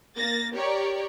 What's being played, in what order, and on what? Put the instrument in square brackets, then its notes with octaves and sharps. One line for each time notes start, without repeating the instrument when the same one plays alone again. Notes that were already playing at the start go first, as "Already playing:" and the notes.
[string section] A#3 A6 A#6
G4 A#4 C#5 D5